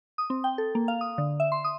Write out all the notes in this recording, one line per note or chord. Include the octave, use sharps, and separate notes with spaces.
D#6
C4
G5
A4
A#3
F5
D#6
D3
E5
C6
D#6